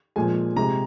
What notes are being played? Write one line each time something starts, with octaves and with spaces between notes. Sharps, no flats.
A#2 F3 G#3 G#5
C3 G#3 A#5